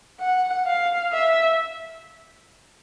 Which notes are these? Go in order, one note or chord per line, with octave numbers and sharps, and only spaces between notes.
F#5
F5
E5